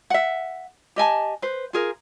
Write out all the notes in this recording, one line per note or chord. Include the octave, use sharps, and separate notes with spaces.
E5 F#5
G4 D#5 G#5 A5
B4 C5
F4 G#4 A#4